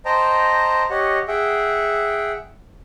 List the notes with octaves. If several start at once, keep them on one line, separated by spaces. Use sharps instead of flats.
C5 D#5 G5 A5 A#5
G4 C#5 D#5 F#5
G#4 E5 F#5 G5